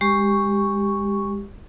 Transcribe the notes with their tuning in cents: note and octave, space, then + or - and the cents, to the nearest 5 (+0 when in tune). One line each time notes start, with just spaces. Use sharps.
G#3 -30 G4 +0 C#6 +0